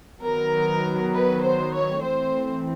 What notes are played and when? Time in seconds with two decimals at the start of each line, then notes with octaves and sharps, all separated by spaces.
0.22 D#3 F#3 B3 A#4
1.11 B4
1.43 C5
1.72 C#5
2.02 E3 A3 C4 C5